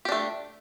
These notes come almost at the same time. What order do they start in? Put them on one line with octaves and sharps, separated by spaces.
G4 D4 A3